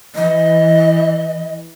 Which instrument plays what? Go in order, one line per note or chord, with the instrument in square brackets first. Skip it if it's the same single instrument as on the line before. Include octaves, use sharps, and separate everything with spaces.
[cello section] E3 [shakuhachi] D#5